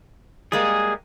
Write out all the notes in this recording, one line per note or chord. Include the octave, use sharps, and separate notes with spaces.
G3 G#3 A#3 G#4